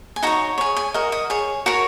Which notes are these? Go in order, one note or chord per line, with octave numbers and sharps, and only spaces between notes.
G#5
D#4 F#4 C#5 A#5
G#4 C#5
G#5
F#4 A#4 D#5
D#5
G#4 C#5
F#4 A#4 C#5